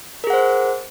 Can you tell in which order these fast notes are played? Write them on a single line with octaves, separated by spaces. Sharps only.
A#4 G#4 F#5 C5